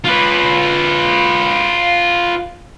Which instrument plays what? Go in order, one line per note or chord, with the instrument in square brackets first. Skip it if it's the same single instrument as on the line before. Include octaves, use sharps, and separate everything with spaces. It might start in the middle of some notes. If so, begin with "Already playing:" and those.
[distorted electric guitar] F4 B4